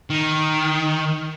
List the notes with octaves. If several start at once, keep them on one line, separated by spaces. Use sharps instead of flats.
D#3